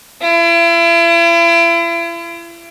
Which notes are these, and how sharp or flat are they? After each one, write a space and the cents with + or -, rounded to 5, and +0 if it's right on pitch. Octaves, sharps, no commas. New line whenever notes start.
E4 +40